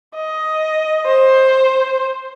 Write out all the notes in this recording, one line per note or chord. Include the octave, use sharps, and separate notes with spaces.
D#5
C5